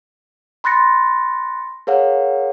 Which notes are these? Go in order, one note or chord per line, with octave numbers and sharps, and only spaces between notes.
B5 C6 F#6 A6 A#6 C#7
G#4 A#4 C#5 F5 F#5